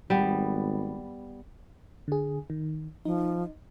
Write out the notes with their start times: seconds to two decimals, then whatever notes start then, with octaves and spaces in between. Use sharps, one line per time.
0.10 G#1 G3 B3
2.08 D3 G#4
2.50 D#3
3.05 F3 D#4